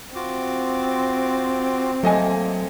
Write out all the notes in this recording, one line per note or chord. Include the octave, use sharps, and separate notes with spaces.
C4 F4 F#4 D6
F#3 A3 A#3 D#5 G#5